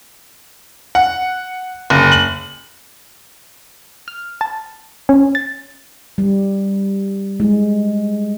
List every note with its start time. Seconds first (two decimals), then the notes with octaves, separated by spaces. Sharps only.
0.95 F#5
1.90 F#1
2.12 F#7
4.08 F6
4.41 A5
5.09 C#4
5.35 A6
6.18 G3
7.40 G#3